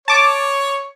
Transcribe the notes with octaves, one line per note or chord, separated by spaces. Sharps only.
C#5 A5 D6